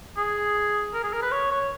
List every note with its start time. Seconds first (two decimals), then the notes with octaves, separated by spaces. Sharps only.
0.17 G#4
0.94 A#4
1.03 G#4
1.13 A#4
1.22 B4
1.32 C#5
1.51 C#5